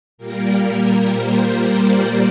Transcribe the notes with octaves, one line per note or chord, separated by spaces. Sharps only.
A#2 G3 A#3 A#4
C5
D5